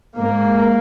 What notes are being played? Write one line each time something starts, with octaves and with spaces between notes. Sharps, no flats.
G#2 A#3